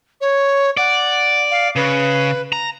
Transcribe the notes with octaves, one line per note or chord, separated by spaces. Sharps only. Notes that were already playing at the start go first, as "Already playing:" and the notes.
C#5
D5 F#5
F5
C#3 B4
A#5